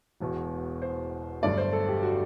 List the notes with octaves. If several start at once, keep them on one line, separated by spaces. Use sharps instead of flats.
E1 E2 B2
C5
G1 G2 F#3 A3 D5
C5
A4
G4
F#4